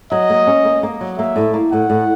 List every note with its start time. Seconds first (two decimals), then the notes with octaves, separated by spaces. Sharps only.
0.12 F#3 D#5
0.30 A#3
0.47 C#4
0.65 A#3
0.83 A#3
1.01 F#3
1.18 A#3 E5
1.36 A2
1.54 A#3
1.72 A2 F#5
1.90 A2